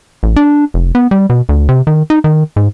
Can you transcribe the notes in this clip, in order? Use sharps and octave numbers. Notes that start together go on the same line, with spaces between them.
A1
D4
F1
B3
G3
B2
D2
C3
D#3
D#4
D#3
G#2